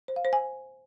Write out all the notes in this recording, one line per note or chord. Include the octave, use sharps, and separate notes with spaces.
C5
F5
C5
G#5